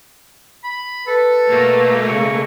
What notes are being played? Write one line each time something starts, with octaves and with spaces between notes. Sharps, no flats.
B5
A4 B4
B2 A3 A#3
C#3 C#6